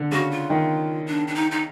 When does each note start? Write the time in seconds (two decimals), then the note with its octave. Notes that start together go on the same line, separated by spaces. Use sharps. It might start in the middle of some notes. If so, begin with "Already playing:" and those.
Already playing: D3
0.12 C#3 F#4
0.31 F4
0.50 D#3
1.07 D4
1.27 D4
1.35 D#4
1.51 D#4